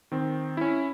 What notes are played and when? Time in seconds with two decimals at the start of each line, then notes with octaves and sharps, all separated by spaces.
0.12 D#3 C4
0.57 C#4 E4